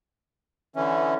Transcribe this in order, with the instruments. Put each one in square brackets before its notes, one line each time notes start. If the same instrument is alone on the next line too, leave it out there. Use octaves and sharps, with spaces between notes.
[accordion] D3 E3 C#4 [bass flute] E5